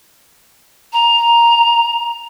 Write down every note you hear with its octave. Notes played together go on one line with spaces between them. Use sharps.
A#5